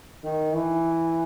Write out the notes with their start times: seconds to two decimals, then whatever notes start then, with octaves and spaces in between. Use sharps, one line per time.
0.24 D#3
0.53 E3